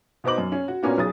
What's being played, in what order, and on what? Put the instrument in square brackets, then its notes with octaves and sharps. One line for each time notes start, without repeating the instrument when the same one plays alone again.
[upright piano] B2 B3 D#4 C5 D6 F#7
F#2
C#4
F#4
A#2 A#3 B3 C#4 D4 F#4
B1 G#4 D#6 A6